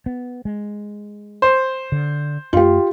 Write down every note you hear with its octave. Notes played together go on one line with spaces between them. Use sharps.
B3
G#3
C5
D3
F#2 A3 F4 G4